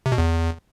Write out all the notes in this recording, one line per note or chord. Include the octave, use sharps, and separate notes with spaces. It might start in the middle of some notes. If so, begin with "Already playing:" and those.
C3
B2
E2